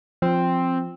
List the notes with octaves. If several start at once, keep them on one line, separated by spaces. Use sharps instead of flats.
F3 C4